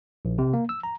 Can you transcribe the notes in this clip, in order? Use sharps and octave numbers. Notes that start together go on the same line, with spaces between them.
A#1
C3
A#3
E6
A#5